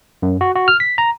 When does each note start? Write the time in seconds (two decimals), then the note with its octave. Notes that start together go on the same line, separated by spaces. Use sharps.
0.22 F#2
0.41 F#4
0.55 F#4
0.68 F6
0.80 B6
0.98 A#5